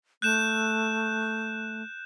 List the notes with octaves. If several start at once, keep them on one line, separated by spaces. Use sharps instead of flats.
A3 F#6 G6 E7